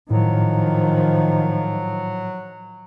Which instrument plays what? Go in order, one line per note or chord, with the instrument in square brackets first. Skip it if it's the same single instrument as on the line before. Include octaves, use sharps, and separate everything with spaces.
[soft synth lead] A2 [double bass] D#3 F3 [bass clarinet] F#3